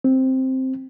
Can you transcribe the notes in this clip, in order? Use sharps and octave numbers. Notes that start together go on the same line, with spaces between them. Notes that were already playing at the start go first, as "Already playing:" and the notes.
C4